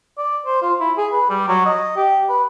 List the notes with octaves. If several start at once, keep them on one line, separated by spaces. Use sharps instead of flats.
D5
C5
F4
E4
G#4
B4
G3
F#3
D#5
G4
B4